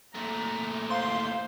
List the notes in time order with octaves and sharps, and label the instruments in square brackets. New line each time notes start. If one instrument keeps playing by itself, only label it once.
[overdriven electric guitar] A#2 A3 [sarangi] A#5
[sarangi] C5 [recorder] F5 [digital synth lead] C6